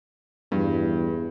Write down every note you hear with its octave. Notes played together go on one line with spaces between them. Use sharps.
E2 G2